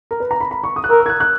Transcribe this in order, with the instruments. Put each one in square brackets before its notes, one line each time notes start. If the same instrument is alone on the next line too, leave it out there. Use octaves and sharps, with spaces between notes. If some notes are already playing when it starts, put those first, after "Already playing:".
[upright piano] A#4
B4
A#5
B5
B5
C#6
D#6
F#6
[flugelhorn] A#4 [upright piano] E6
[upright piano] E6
G#6
F#6
F#6